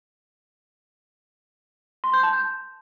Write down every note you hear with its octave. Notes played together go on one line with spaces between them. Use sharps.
C6
G6
A5
G6